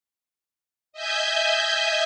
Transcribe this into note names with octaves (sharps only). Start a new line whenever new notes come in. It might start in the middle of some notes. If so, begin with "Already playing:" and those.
D#5 E5 G#5 G6